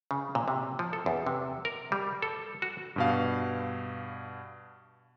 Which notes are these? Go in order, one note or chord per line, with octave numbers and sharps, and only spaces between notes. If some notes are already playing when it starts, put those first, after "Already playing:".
C#3
A#2
C3
F3
A4
E2
C3
A#4
G3
A4
F#4
G2 B2 F5